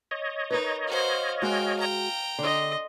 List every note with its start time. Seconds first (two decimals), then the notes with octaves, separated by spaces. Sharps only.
0.11 C#5 D#5
0.50 D#4 A#4 B4
0.87 F#4 C5 F5
1.42 G#3 F#4 A#4 G5
1.79 G5 A#5
2.39 D3 D#5 C6